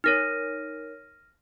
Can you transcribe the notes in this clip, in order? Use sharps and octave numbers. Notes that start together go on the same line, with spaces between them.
D#4 A#4 C#5 F6 A#6 D#7